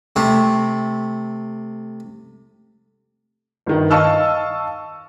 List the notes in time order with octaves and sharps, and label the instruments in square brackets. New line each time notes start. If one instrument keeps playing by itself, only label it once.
[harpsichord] C3 A3
[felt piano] G1 D#3
D#5 F5 A5 C#6 E6 F6